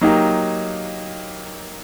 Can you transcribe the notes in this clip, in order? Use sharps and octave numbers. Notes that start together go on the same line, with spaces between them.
F#3 A#3 D#4 G4